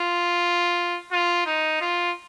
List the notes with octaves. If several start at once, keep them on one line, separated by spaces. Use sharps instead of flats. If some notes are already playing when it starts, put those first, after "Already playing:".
Already playing: F4
F4
D#4
F4